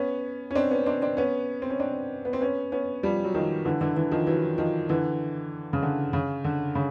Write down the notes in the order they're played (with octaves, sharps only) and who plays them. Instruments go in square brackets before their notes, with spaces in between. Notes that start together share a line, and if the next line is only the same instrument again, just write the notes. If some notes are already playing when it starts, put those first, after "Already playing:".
Already playing: [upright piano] B3 C#4
C#4
C4 D4
B3 C#4
C4 D4
C4 D4
B3 C#4
C4
C#4
C4 D4
B3
C4
B3 C#4
B3 C#4
F3 G3
F#3
D#3 F3
D3 E3
D3 E3
D3 E3
D#3 F3
E3 F#3
D#3 F3
D3 E3
C#3
D3
C#3
D3
C#3